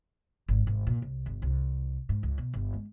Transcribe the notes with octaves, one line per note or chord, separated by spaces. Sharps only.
G#1
G#1
A#2
C2
G1
C2
G#2
C#2
B2
G1
G#3